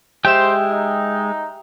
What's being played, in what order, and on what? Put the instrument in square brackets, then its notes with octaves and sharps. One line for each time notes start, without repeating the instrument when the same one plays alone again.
[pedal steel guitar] G#3 G5 G6 [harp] G4 E5 E7 [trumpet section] C5
[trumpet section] D#4